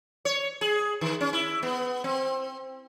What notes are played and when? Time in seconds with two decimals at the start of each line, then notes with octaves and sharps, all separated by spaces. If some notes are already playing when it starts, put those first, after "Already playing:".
0.25 C#5
0.61 G#4
1.01 D#3
1.21 C#4
1.33 E4
1.63 B3
2.04 C4